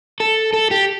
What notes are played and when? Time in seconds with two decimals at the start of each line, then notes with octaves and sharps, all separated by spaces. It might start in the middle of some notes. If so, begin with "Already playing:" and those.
0.20 A4
0.53 A4
0.71 G4